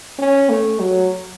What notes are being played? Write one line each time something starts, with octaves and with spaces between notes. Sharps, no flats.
C#4
A3
F#3